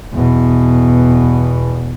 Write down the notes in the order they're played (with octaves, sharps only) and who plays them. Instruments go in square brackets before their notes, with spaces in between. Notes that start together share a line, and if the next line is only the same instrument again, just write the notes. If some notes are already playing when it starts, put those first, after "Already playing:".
[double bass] E2 B2